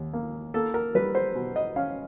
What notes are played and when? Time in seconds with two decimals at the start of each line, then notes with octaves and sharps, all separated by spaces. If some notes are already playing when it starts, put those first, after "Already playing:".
Already playing: D#2
0.13 A#3
0.54 A#3 A4
0.74 A#4
0.95 G3 B4
1.15 C5
1.35 B2
1.56 D#5
1.76 C#4 F5